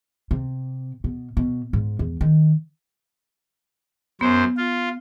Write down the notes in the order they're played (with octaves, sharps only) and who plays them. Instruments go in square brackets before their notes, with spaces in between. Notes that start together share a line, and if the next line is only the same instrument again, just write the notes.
[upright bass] C3
B2
B2
G#2
E2
D#3
[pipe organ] F#2 C5 [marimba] B3
[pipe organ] F4